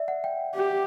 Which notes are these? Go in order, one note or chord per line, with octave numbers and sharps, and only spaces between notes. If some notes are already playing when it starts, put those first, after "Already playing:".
Already playing: D5 E5
F#5
G5
G4